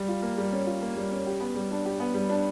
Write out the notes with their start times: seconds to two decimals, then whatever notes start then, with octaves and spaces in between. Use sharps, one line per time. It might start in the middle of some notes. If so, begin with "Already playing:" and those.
Already playing: G3
0.08 F4
0.22 A#3
0.38 G3
0.52 C#4
0.66 F4
0.82 A#3
0.96 G3
1.12 C#4
1.26 G4
1.40 B3
1.55 G3
1.71 D4
1.85 G4
2.00 B3
2.14 G3
2.29 D4